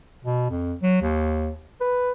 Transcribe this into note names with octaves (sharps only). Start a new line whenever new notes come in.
B2
F2
F#3
D#2
B4